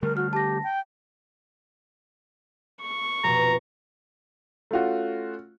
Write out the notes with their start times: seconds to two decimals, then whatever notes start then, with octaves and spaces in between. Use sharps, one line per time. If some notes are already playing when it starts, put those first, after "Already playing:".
0.03 D3 G3 A3 A#4
0.17 F#4 F6
0.33 G4 A5 A#6
0.63 G5
2.82 C#6
3.24 F1 B2 A#5
4.71 A3 C#4 F4 F#4